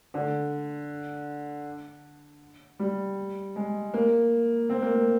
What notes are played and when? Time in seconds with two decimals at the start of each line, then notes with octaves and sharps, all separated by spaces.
0.14 D3
2.79 G3
3.56 G#3
3.94 A#3
4.70 C4
4.82 A#3
4.95 A#3